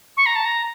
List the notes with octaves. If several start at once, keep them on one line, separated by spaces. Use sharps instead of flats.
C#6
A#5
A5
A#5